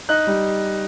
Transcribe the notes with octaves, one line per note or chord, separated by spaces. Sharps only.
D#4 F#6
G3